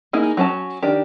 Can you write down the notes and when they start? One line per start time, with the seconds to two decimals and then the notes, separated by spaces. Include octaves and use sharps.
0.13 A#3 D#4 E4 G#4
0.37 F#3 C#4 A5
0.83 D#3 D4 G4